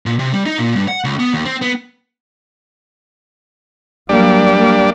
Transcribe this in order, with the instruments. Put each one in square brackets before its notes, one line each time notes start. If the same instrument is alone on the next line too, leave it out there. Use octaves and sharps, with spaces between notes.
[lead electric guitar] A#2
C3
G3
D#4
A#2
G2
F#5
C#2
B3
D#2
C4
B3
[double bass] F#3 A#3 [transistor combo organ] G3 D4
[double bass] A#3